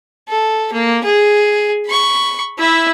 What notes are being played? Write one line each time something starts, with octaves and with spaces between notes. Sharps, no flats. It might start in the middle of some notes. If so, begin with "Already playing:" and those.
A4
A#3
G#4
B5 C#6
E4 E5